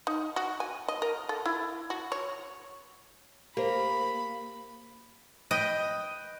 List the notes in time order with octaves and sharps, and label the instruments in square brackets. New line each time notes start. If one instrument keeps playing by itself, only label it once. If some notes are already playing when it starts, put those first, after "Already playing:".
[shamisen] D#4
F#4
G#5
D#5
A#4
A4
E4
F#4
C#5
[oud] A#3 [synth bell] G4 C5 [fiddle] B5
[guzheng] B4 D#5 G5